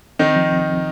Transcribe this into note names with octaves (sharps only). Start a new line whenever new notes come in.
D#3 C4 D#4
F3
C2